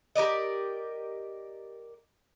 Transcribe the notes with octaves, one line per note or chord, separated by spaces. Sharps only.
G4 A#4 D5 D#5